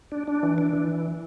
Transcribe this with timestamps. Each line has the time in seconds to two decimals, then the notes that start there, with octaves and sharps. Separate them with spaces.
0.12 D4
0.28 D4
0.43 E3
0.58 D4
0.73 E3